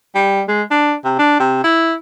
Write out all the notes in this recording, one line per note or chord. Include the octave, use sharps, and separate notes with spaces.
G3
G#3
D4
C3
D4
C3
E4